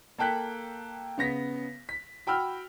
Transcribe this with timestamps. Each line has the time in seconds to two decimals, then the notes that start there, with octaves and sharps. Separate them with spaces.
0.18 A#3 A4 G5 F#6 B6
1.18 C#3 B3 A#6 B6
1.89 B6
2.27 F#4 G5 B5 E6 F6